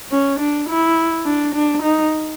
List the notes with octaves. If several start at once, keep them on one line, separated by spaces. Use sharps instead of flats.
C#4
D4
E4
D4
D4
D#4